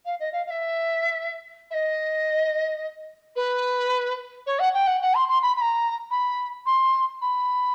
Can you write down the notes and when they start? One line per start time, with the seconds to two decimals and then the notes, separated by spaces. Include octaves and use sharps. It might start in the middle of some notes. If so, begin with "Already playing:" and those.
0.05 F5
0.19 D#5
0.32 F5
0.46 F5
0.50 E5
1.70 E5
1.74 D#5
3.36 B4
4.46 C#5
4.59 F#5
4.74 G5
4.87 F#5
5.01 F#5
5.14 C6
5.29 C6
5.42 B5
5.56 B5
5.61 A#5
6.10 B5
6.66 C6
7.21 B5